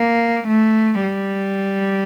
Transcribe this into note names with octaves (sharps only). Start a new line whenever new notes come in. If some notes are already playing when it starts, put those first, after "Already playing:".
Already playing: A#3
A3
G3